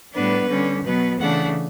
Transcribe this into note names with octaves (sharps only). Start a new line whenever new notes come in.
A2 G3 B3 D4 B4
D3 G3 C#4
B2 F#3 B3 B4
C#3 E3 A3 D4 F#5